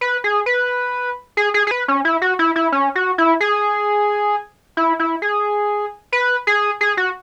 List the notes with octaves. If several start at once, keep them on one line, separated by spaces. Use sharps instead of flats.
B4
G#4
B4
G#4
G#4
G#4
B4
C#4
E4
F#4
E4
E4
C#4
F#4
E4
G#4
E4
E4
G#4
B4
G#4
G#4
F#4